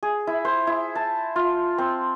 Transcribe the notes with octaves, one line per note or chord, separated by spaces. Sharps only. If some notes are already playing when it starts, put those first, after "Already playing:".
G#4
E4
C5
E4
A5
F4
C4